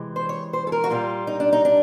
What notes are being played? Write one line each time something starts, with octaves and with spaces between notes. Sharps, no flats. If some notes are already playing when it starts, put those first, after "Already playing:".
Already playing: C3 E3 G#3
C5
C#5
C5
A4
A#4
F#4
A#2 G3 F4
D#4
D4
D#4
D4